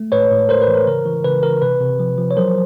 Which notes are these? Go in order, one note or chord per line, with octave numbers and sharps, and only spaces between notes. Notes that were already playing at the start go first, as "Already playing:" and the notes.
Already playing: A3
A2 B4 C#5
A2
A2 A#4 C5
B4
E3
A#4
C#3 A#4
E3
C#3 B4
E3 A#4
C3 B4
C3
F3
F3
C#5
F#3 A#4 C5